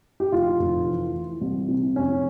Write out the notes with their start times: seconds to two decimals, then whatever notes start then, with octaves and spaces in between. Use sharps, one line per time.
0.20 G4
0.32 F1 F4
0.59 F1
0.87 E3
1.15 E3
1.41 C2
1.68 C3
1.96 F1 C#4